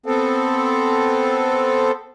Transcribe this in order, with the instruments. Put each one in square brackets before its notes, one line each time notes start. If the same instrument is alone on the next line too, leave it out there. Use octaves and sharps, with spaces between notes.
[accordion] B3 C4 A4